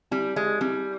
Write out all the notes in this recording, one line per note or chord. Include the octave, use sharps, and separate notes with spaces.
G3 C4
G#3 G4 D5
G3 C4